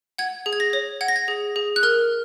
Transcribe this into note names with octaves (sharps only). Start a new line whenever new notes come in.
F#5 G#6
G#4
G#6
A#6
C#5
F#5 G#6
A#6
G#6
G#4
G#4
F#6
A#4 F6